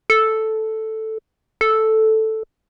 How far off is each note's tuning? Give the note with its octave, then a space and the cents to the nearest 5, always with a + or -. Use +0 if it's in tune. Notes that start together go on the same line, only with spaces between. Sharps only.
A4 +0
A4 +0